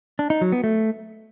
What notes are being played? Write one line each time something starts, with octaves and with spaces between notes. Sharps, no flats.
D4
D#4
F#3
B3
A3